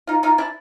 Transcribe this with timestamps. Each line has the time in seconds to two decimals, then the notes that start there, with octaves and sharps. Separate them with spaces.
0.07 D#4 F4
0.23 D#4 F4
0.38 D4 E4